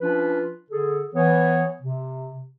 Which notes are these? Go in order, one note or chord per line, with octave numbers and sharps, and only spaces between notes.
F3 C#4 D4 F4 B4
D3 G#4 A4
E3 B3 C#5
C3